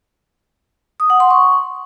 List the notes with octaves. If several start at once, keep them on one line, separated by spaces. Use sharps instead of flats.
D#6
F#5
C6
C#6